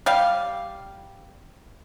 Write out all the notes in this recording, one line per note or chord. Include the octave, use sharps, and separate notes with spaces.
G3 G4 F5